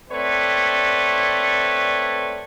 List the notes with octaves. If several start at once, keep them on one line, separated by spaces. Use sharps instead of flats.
A3 C4 B4 C#5 D5